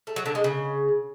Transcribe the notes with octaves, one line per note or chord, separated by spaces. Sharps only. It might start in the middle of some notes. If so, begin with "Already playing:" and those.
A3
F#3
D3
G#3
C#3